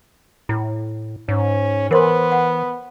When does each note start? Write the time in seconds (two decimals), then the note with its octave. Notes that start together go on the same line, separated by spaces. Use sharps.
0.49 A2 E4
1.29 G#2 C#4
1.91 E3 B3 A#4 C5 C6
2.32 F#5